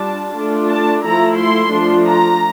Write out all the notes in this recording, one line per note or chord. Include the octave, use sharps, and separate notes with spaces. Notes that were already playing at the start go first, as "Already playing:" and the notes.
Already playing: G3 D4 F4 A5
A3 D4 F4
A5
F3 A3 E4 A#5
C6
F3 A3 D4 F4
A#5